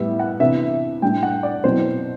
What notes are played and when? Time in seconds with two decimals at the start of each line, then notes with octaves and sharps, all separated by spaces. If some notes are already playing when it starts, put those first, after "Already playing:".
Already playing: A2 G3 B3 E4 E5
0.19 F#5
0.40 C3 E3 B3 D4 E5
1.02 A2 G3 D4 G5
1.23 F#5
1.43 D5
1.64 B2 F#3 C4 E4 C5